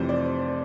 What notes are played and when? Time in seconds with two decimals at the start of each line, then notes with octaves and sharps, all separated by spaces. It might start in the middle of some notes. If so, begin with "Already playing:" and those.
Already playing: F1 F2 E3 G3 C4 C5
0.09 D5